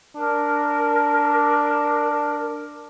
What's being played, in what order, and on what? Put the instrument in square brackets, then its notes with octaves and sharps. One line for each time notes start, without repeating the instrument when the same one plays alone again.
[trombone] D4 [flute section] A#4